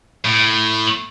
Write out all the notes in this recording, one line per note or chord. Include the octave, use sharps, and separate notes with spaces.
A2